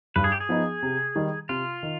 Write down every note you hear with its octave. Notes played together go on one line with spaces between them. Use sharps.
G2 B4
G#4
G4
G#4
F3 B3 D#4
C3
D#3 G3
C3 F4
D#3